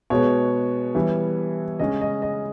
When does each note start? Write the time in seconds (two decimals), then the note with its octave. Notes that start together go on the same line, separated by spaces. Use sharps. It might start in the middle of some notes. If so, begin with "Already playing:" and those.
0.10 B2 G#3 B3 C#5
0.95 E3 G3 B3
1.79 C#3 G#3 C#4 D#5
2.01 D#5
2.22 D#5